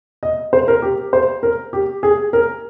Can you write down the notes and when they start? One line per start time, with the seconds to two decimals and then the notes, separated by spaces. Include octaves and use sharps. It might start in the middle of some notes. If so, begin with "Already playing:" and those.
0.23 D#5
0.53 C5
0.68 A#4
0.82 G4
1.13 C5
1.43 A#4
1.73 G4
2.03 G#4
2.33 A#4